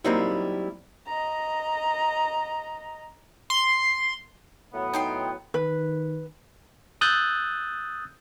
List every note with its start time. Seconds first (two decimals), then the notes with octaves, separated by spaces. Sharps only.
0.04 F#3 G3 A#3 C4 D#4 E4
1.07 D#5 A#5
3.50 C6
4.74 A2 F#3 B3
4.93 D#4 G5 C6
5.54 D#3 B4
7.01 D#6 E6 F#6 G6 A6